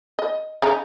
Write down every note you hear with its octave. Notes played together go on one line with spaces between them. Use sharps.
D#5
C#3 D#4 A#5